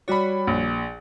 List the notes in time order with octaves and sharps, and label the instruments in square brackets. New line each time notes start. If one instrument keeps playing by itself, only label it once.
[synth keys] G3 F#4 C#5 [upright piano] D5 B5
[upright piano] A#1